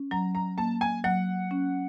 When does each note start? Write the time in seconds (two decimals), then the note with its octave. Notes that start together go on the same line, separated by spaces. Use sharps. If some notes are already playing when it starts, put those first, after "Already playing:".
Already playing: C#4
0.11 F#3 A#5
0.35 A#5
0.58 A#3 A5
0.81 G#5
1.04 F#3 F#5
1.51 C#4